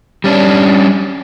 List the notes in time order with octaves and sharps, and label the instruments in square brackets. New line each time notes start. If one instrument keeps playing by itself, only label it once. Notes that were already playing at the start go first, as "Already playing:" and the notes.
[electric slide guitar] G3 C#4 D4